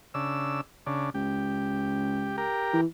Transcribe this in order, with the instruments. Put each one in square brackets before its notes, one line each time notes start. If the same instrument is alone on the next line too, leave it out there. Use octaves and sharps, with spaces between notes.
[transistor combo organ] C#3 D4 E6
C#3 D4
[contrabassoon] C#2 [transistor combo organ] G4
[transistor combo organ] G4 A#4
[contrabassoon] E3